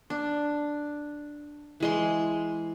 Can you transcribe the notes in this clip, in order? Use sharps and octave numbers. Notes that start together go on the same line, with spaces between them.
D4
E3 G#3 C6